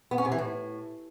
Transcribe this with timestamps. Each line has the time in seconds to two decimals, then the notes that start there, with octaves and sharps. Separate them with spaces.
0.11 B3
0.18 C#4
0.25 C3
0.32 E3
0.38 A2